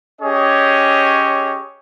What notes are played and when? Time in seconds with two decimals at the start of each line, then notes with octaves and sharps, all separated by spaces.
0.21 C#4 G4 G#4 C#5 D#5